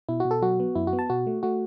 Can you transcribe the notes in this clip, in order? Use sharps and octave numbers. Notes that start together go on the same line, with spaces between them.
B2 E4
F#4
B2
A4
F#3 F#4
B3
F#2 E4
F#4
B3
A5
B2 F#4
A3
A3 F#4